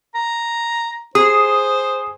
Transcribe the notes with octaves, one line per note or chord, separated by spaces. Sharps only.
A#5
G#4 C5 D#6